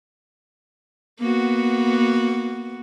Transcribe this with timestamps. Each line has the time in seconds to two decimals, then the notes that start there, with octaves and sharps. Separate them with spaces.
1.20 A#3 B3 F#4